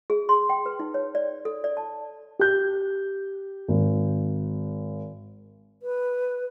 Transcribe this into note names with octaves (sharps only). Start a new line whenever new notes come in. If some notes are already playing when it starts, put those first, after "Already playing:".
G#4
C6
G5
B4
D#4
C#5
D5
A4
D5
A5
G4 G6
G#1
B4